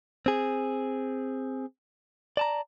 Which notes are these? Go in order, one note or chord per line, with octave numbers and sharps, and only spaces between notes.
C4 G#4
D5 A5 A#5